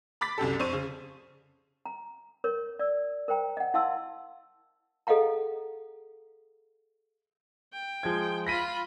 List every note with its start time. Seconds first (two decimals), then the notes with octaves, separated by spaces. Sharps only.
0.21 B5 D6 A6 B6
0.38 C2 F#2 G4 A4
0.59 F2 C5 C#6 D#7
0.73 C#3
1.86 A#5
2.44 A#4 C#5
2.79 D5 E6
3.28 A#4 C5 G5 A#5
3.57 D#5 F#5
3.74 E4 F5 F#5 A5 C6 E6
5.07 G#4 A4 D#5 F5 F#5 A#5
7.73 G5
8.03 F3 G#3 G#6
8.47 F4 B5 A#6 B6 D#7